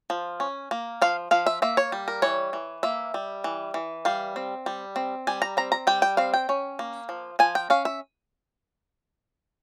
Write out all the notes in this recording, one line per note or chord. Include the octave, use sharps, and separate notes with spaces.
F3
C#4
A#3
F3 F5
F3 F5
E5
A#3 E5
C#5
G3
A#4
E3 C#5
E3
A#3 E5
G3
E3
E3
G3 F5
C4
G3
C4
G3 G#5
A#5
C4 A#5
A#5
G3 G5
G5
C4 F5
G5
C#4
A#3
F3
F3 G#5
G5
C#4 F5
E5